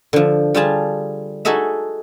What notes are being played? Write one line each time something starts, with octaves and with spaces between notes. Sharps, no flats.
D3 F3
G3 F4 G4 G#4 A5
D#4 F#4 G#4 A4 D#5 E5